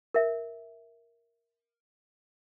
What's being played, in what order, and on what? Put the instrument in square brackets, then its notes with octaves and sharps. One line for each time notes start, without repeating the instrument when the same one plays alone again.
[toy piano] A#4 E5